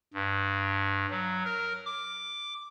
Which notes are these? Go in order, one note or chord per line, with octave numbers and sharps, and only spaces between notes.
G2
F#3
A#4
D6